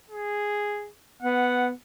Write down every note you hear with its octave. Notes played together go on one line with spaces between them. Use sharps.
G#4
B3 F#5